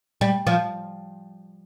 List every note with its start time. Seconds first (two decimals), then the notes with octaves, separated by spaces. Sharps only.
0.21 G3
0.47 F3